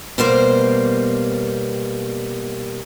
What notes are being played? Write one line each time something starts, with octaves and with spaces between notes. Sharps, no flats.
B2 G3 A#3 C5